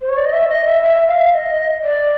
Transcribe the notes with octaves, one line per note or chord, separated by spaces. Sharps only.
C5
C#5
D5
D#5
E5
D#5
E5
E5
E5
F5
E5
D#5
D5